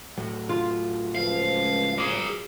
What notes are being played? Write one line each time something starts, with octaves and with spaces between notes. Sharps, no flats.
A2 F#3
F4
C#2 F3 F5
G#4 A#4 D6 C7